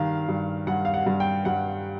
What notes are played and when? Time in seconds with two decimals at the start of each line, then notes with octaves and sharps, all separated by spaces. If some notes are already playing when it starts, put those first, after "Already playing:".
Already playing: G2 D#3 G3 F5
0.29 G2
0.67 G2 F#5
0.85 F5
0.94 F#5
1.06 G2
1.20 G5
1.45 G2 F#5